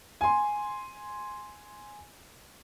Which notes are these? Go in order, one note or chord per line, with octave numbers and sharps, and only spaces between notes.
G#5 C6